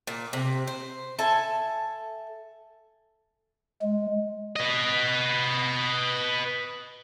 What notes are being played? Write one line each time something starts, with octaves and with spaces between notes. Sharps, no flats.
A#2
C3
C5
A4 E5 G#5
G#3
B4 D#5